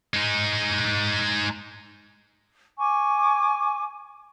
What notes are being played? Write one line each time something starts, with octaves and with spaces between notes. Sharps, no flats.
G#3 D#4
G#5 C#6 D6